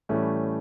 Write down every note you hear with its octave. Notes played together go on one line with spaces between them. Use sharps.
A2 E3 G3 A3 C#4